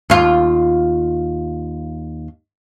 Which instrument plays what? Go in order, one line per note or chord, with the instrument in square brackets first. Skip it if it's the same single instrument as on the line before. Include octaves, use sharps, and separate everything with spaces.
[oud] D#2 F4